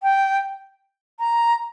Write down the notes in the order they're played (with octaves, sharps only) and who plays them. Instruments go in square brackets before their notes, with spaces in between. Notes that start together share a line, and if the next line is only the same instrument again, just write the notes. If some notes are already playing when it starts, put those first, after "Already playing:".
[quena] G5
A#5